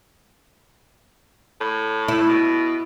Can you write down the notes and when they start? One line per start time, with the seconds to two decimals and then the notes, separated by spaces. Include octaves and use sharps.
1.61 A2
2.08 E4
2.29 B2